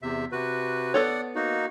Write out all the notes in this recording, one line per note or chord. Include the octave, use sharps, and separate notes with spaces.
E2 C3 E5
C3 F#4 B4
B3 A4 C#5 D5 F#5
A#3 D#4 F#4